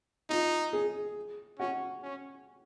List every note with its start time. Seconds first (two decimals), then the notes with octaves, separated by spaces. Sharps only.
0.29 D#4 F4
0.73 G#4
1.59 C#4 F#4
2.03 C#4